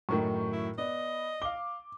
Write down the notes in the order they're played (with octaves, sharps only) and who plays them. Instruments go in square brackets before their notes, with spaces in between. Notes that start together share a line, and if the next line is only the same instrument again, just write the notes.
[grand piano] F#2 A2 D#3 [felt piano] A#4 C#6
[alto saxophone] E4
[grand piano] B3 [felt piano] D5 [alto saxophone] D#5
[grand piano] F5 G7 [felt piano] D6